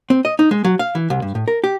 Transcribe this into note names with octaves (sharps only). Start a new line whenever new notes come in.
C4
D#5
D#4
G#3
F#3
F5
E3
C2
G2
A2
A#4
G4